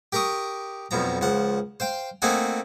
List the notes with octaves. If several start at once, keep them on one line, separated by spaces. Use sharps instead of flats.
G4 A#4 A#5 C#6 D#6
B1 F2 B2 F3 A#5
C#2 F3 F#5
C5 F5 G5
A3 A#3 C4 D#4 F#5 G#5